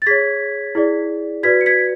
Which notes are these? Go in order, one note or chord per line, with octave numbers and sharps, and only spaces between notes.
A6
G#4 C#5 G#6 B6
E4 G#4 D5
F#4 B4 D5 G#6 B6
C#7
G#6 B6